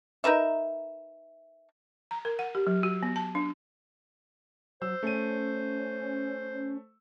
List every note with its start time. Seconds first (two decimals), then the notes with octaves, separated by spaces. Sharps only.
0.24 D#4 A#4 B4 E5
2.11 A#5
2.25 A#4
2.39 F#5
2.55 G4
2.67 F#3
2.83 F#4
3.03 B3
3.16 A5
3.35 D4
4.82 F#3 C5 E6
5.03 A3 C#4 D#7